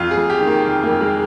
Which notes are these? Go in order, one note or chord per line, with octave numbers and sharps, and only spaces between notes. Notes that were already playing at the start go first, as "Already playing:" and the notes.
Already playing: F2 F4
G#4
F2
G4
D#3
A#3
F2
A#3
F2
G#3